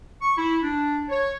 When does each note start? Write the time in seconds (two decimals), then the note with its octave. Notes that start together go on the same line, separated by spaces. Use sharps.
0.21 C#6
0.37 E4
0.62 D4
1.09 C#5